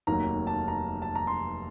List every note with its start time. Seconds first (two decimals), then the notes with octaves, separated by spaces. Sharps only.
0.07 F1 D#2 D#3 F#3 A#3 A#5
0.47 A5
0.68 A#5
1.02 A5
1.15 A#5
1.27 C6